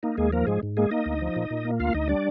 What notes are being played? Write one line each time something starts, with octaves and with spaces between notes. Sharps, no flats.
A#3 D#4
D#2 G#3 G#4
F3 A#3 A#4
G#2 G#3 G#4
G#2
G#3 A#3 G#4
A#3 D#4 D#5
D2
F3
A#2
A#2
A#3
D2 F4 F5
D2 D#4 D#5
G3 D4 D5